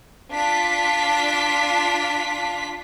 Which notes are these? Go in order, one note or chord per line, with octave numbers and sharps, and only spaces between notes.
D4 F4 B6